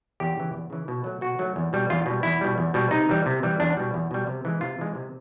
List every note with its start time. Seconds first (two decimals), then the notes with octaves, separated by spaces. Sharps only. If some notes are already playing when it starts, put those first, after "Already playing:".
0.20 E2 G4
0.37 C#3 E3
0.54 E2
0.70 C#3 E3
0.88 B2
1.04 F#3 A3
1.21 B2 F#4
1.39 F#3 A3
1.56 E2
1.73 B2 G3
1.90 E2 F4
2.06 B2 G3
2.23 E2 E4
2.41 B2 G3
2.58 E2
2.74 B2 G3
2.91 C3 D#4
3.09 E3 G3
3.26 C3
3.43 E3 G3
3.60 E2 D4
3.77 B2 G3
3.94 E2
4.11 B2 G3
4.27 C3
4.45 E3 G#3
4.61 C3 F4
4.79 E3 G#3
4.95 C3